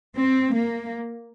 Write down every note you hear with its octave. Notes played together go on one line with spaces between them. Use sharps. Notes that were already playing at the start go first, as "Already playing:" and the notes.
C4
A#3